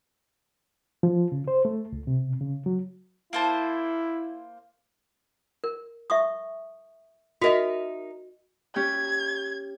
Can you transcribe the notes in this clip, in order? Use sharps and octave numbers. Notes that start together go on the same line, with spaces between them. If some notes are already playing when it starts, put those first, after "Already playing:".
F3
C#3
C5
A3
C#2
C3
C#3
F#3
A#3 E4 C5 A5
A#4
E5 C#6 D#6
D#4 F#4 A#4 D#5 E5
C#4 G4 G#6